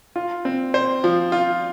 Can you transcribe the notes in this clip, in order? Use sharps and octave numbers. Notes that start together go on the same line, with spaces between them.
F4
C4
C5
F3
F4